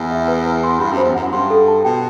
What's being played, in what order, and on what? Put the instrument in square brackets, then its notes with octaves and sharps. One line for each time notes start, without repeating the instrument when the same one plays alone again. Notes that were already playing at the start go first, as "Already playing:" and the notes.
Already playing: [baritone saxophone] E2
[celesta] E5
B4
B4
C6
[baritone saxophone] G2 [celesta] B5
[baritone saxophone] F#2
[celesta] C5
[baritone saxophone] E2
[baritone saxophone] F#2 [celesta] F#5
[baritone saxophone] G2 [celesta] C6
[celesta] A4
A5
[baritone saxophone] B2 [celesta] G5